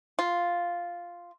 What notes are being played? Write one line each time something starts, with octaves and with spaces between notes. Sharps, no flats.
F4